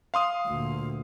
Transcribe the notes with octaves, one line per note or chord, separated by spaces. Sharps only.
F5 C6 D#6
D2 A#2